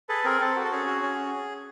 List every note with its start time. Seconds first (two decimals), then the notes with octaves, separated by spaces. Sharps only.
0.09 G#4 A4 B4
0.24 C4 G#4 A#4
0.41 C4 A4
0.56 F#4
0.65 A4
0.72 C#4 G#4
0.86 F#4
1.02 C#4